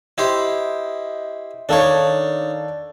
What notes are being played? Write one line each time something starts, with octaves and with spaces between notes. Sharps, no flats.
E4 G4 C5 D#5
D#3 D4 D#4 A4 C#5 D5 F5 A5